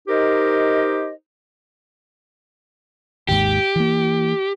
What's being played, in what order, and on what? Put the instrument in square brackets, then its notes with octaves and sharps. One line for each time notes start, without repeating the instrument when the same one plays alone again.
[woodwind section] D#4 G4 A#4 C5 D#5
[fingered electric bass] G#1 D#2 G#2 [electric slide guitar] G4
[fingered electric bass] E3 A#3